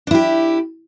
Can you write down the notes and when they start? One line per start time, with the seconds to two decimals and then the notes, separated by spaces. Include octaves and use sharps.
0.07 D4
0.11 E4
0.15 G4